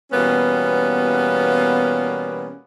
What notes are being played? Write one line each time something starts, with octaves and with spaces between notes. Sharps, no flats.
B2 E3 G3 A#3 B3 C#4